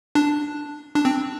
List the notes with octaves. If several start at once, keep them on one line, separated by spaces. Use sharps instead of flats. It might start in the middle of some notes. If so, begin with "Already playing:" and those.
D4
D4
C4